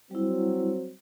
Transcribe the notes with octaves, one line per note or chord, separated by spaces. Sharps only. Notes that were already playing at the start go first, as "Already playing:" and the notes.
F#3 G3 C4 E4